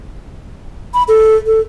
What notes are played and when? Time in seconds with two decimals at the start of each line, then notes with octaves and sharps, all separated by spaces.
0.94 B5
1.08 A4
1.46 A4